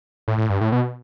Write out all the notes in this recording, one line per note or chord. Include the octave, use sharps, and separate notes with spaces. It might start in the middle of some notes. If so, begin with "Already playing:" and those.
A2
A2
G2
A2
B2